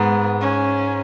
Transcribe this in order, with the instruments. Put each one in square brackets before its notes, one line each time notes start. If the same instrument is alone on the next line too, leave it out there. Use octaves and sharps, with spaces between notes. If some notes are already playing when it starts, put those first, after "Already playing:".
Already playing: [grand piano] G#2 [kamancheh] B3
[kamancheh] C#4